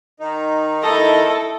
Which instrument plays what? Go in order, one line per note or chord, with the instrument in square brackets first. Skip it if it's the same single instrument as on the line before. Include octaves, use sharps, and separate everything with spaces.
[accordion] D#3 D#4
[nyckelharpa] E4 D#5 [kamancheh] A4